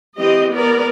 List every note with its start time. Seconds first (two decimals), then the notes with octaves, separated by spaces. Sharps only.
0.19 E3 C4 G4 D#5
0.53 B3 A#4 D5